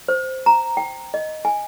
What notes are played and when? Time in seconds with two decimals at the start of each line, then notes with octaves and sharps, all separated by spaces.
0.08 C5
0.46 A#5
0.77 G5
1.14 D#5
1.45 G#5